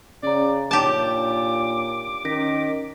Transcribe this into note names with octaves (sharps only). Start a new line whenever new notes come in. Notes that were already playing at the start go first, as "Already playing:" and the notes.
C#3 C#4 D5 A#5
A#2 D4 D#4 G4 C#5 A5 D6
D#3 C#4 A#6 B6